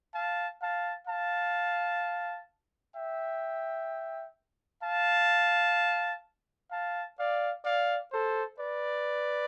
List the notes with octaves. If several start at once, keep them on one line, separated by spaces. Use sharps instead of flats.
F5 A5
F5 A5
F5 A5
E5 G5
F5 A5
F5 A5
D5 F5
D5 F5
A4 C5
B4 D5